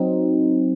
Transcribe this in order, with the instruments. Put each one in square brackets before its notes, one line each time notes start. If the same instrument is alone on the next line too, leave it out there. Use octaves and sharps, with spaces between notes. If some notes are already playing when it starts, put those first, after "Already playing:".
Already playing: [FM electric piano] F#3 C4 D#4